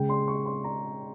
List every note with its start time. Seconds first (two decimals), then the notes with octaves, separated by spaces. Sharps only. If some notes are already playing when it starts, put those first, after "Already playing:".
Already playing: C#3 G#3 G5
0.09 C6
0.28 C#6
0.46 C6
0.64 A#5